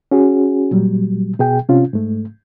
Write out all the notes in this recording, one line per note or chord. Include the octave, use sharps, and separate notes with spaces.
C#4 F#4 G#4
A#2 F#3 G3
B2 G#4 G5
C3 C#4 F4
G#2 A3